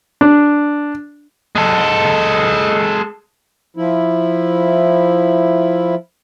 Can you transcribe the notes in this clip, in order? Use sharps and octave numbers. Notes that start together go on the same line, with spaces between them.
D4
G#3 A4
F3 E4